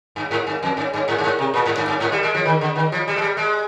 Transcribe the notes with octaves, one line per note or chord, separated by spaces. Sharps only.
G2
G#2
G2
F2
G2
G2
G#2
G2
G#2
C3
A#2
G#2
G2
G2
G#2
G3
G#3
F3
D#3
D3
D#3
F3
G3
G#3
G3
G#3